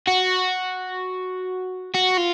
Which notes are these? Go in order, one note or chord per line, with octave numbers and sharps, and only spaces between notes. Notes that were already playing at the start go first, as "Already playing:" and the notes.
F#4
F#4
F4